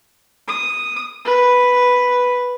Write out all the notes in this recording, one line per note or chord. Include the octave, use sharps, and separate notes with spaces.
D#6
B4